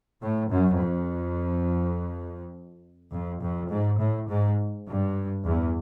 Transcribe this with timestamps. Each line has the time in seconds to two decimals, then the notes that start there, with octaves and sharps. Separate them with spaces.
0.23 A2
0.51 F#2
0.80 F2
3.12 F2
3.42 F2
3.70 G#2
3.99 A2
4.29 G#2
4.87 G2
5.44 E2